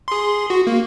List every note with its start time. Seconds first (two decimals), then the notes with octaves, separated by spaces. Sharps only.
0.08 G#4 C6
0.50 F#4
0.67 A#3